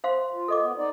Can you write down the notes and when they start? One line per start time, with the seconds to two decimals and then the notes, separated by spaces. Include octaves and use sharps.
0.04 C5 F5 C6
0.33 F4
0.48 A4 D#5 D6
0.61 B3
0.77 D#4 D5